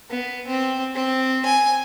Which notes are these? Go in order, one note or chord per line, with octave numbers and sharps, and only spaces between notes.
B3
C4
C4
G#5